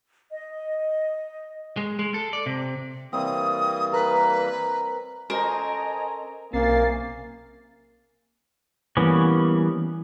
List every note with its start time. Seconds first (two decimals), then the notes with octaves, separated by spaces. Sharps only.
0.31 D#5
1.77 G#3
1.99 G#3
2.14 A4
2.33 D5
2.46 C3
3.13 E3 G3 A#3 C4 D#6
3.93 A#4 B4
5.30 C#4 A4 A#4 C5 D#5 G#5 A#5
6.53 B1 C3 A#3 C#4 A6 C7
8.97 E3 G3 A#3 B3 C#4